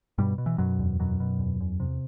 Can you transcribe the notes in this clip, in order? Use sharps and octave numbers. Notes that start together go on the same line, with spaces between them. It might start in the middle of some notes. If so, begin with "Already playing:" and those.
G2 B2 G3
B2
E3
F#2 B2 F#3
E2
F#2 B2 F#3
B2
E2
E2
C3